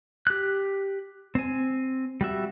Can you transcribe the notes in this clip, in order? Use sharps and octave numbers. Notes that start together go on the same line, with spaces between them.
G4 F#6
C4 G#5
G3 F#4 E5